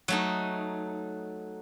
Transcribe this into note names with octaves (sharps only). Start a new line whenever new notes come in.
F#3 A3 D#4